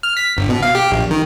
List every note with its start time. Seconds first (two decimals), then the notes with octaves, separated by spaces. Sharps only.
0.03 F6
0.17 B6
0.37 G1
0.49 B2
0.62 F5
0.75 G4
0.91 A#1
1.11 D#3